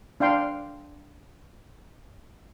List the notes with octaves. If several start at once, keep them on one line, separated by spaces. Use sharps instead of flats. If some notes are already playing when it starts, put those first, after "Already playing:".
D4 F5 G5 C6